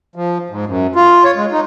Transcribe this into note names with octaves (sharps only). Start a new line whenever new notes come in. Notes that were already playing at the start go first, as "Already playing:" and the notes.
F3
G#2
F#2
F4
C#5
G#3
D#4